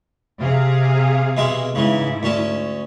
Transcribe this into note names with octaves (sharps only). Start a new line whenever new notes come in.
C3 G#4 F5
B2 G#3 E5
G#2 C#3 E3 E4
D2 C#4 A5